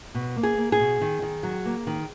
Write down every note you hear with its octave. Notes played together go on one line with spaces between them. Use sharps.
B2
A#3
G#4
A#3
G#4
B2
D#3
D#3
F#3
A#3
D#3